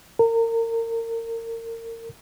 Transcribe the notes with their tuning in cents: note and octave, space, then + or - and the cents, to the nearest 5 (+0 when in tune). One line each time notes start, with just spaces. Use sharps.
A#4 -30